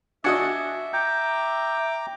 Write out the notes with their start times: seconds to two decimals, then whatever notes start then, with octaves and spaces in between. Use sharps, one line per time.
0.24 D4 F#4 D#5 E5 G#5 G#6 C#7
0.93 G5 A#5 D6 G6